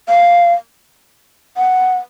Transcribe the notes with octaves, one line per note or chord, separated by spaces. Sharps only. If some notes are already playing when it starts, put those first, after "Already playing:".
F5
F#5